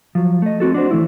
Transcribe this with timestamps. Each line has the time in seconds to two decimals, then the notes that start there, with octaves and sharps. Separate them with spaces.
0.15 F3 F#3
0.42 A3 D#5
0.60 C4 F#4 A4
0.74 D4 F#4 C5
0.91 E3 A3 E4